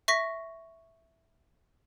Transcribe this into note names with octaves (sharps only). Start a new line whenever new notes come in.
E5 C#6 A#6 B6